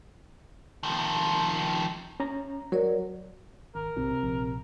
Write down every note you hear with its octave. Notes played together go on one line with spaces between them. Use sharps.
D#3 F3
C#4 A#5
F#3 A#4 C#5 D5
G#1 A#4
B1 C3
A#1